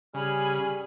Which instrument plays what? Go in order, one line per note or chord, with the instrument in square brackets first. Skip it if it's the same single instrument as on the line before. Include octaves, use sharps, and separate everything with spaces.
[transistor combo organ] C#3 [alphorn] G3 [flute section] G#4 B5 F6 [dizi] G#5